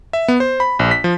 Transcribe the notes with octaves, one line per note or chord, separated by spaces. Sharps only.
E5
B3
C5
B5
A#1
B6
F3